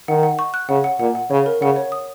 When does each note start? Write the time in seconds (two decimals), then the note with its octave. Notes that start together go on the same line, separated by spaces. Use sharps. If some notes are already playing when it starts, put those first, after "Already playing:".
0.08 D#3 F#5
0.23 F#5
0.39 C#6
0.54 F#6
0.69 C#3 F#5
0.84 F#5
0.99 A#2 F#5
1.15 F#5
1.31 C#3 C#5
1.46 A#4
1.61 C#3 F#5
1.76 C#5
1.92 D#6